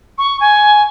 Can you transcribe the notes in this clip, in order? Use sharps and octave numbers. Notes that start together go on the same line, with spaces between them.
C#6
G#5